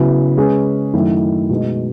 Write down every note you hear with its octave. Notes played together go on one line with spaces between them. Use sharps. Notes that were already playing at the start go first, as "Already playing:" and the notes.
Already playing: C#3 F#3 B3 E4
G#3 C#4 G#4 B4
F#2 D#3 A3 E4
B2 G#3 D#4